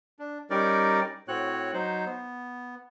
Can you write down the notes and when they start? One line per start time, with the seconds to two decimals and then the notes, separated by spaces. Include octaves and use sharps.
0.19 D4
0.50 G3 C#4 D#4 A#4 D5
1.28 A2 C4 F#4 C#5 F#6
1.74 F#3 D#4 C5
2.06 B3